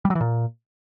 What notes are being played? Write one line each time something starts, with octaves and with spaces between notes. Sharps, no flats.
G3
F#3
E3
A#2